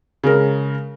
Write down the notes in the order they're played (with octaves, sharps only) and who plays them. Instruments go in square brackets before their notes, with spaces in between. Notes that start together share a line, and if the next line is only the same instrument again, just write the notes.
[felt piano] C#3 G#3 A#4